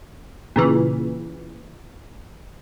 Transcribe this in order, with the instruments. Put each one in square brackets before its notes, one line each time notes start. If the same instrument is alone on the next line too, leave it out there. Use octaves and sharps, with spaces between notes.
[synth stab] A#2 C#3 E3